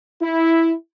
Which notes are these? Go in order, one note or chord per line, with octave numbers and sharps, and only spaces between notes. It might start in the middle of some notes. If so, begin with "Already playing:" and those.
E4